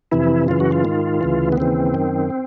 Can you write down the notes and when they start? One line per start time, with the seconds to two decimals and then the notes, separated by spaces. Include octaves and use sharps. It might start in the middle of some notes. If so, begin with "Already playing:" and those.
0.12 F2 C3 E3 E4
0.48 F#2 C#3 E3 F4
0.60 F#4
0.72 F4
0.84 G#2 D#3
1.21 D2 C#3 E3
1.52 B3
1.57 D#2 C#3 E3 C4
1.94 F#2 D#3